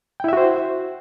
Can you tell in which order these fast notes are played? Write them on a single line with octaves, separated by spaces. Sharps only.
G5 E4 E5 F#4 C5